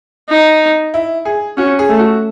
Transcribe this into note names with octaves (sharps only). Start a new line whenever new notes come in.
D#4
E4
G#4
C#4 F#4
G#4
A3
F#4